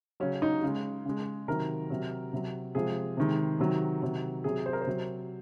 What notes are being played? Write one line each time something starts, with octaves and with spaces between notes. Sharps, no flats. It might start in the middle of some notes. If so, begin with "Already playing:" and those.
C#3 F#3 C#4
D#4
C#3 G#3
C#3 G#3
C3 D#3 F#3 A#4
C3 F#3
C3 F#3
C3 F3 G#3 G#4
C3 D#3 G#3
C3 D#3 F#3
C3 D#3 F#3
C3 F#3 G#4
C5
A#4
C5
C3 F#3